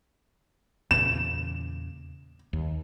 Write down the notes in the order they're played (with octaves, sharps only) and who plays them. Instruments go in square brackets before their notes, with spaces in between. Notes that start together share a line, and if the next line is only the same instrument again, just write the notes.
[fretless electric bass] E2 A#2 C#3 [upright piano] E7
[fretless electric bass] D#2